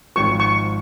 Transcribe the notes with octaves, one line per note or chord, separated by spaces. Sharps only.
G#1 G#2 F3 C#6
C#6